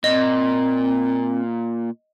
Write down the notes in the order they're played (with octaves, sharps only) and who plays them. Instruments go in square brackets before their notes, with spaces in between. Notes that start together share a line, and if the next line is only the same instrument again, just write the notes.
[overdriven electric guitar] A#2 [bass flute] C4 [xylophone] D#5